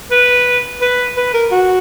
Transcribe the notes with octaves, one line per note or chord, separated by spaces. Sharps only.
B4
B4
B4
A#4
F#4